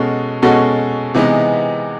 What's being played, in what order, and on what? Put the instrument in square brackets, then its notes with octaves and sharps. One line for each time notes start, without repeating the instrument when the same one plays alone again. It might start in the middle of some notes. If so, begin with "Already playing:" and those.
Already playing: [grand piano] B2 G#3 C#4 F#4 A4
B2 G#3 C#4 F#4 A4
C3 E3 G#3 B3 D#4